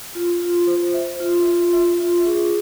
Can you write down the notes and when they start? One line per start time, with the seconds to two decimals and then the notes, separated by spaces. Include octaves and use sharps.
0.15 F4
0.42 F4
0.67 C5
0.94 E5
1.20 F4
1.47 F4
1.73 E5
2.00 F4
2.26 G#4